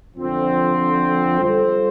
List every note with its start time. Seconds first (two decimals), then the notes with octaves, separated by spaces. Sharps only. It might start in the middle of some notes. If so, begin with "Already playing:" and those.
0.17 F2 D3 F3 C4
1.40 G3 F4 A4 C5